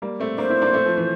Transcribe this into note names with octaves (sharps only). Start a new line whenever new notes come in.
G3 A#3
A3 C4
A#3 D4 C5
C4 E4
A#3 D4
A3 C4
F3
E3